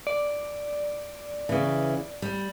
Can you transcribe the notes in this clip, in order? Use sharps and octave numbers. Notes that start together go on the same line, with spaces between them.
D5
C#3 E3
G3